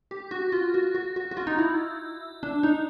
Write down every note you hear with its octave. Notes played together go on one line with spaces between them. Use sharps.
G4
F#4
F4
F#4
F#4
F#4
F#4
F4
D#4
E4
D4
D#4